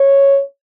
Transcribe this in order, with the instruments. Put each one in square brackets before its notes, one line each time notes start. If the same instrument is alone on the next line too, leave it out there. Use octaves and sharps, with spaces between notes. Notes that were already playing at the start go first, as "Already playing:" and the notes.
Already playing: [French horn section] C#5